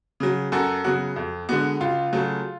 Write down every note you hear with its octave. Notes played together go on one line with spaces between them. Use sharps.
C#3 F#3
F#2 F#4 A4
C#3 F#3 B3 F#4
F2
D3 G#3 B3 F#4
C#2 F4
C#3 F#3 A3